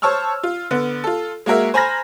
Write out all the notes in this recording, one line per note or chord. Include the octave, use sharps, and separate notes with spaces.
C5 C#5 A5 C#6 E6 F6
F4
D3 B3
F4 A4
G#3 A#3 F#4 A#4 E5
C5 G#5 A#5 B5 F6 A#6